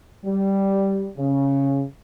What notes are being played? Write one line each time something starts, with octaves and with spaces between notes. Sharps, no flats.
G3
C#3